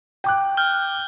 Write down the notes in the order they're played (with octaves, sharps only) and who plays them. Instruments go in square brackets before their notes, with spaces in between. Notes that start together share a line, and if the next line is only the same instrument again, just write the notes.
[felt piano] G5 D6 F#6
[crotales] F6 G6 G7